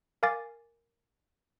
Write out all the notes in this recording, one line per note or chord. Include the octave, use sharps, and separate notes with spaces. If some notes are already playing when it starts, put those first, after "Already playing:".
A#4 F5 G#5 D6 A6